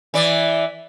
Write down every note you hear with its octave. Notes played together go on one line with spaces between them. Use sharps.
E3 D5